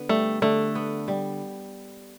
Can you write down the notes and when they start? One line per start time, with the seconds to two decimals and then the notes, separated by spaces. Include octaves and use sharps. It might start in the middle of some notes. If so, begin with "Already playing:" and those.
Already playing: D3 B3
0.09 G3 A3
0.42 D3 A3
0.75 B3
1.08 G3